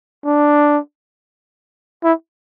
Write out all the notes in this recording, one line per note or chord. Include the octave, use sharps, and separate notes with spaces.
D4
E4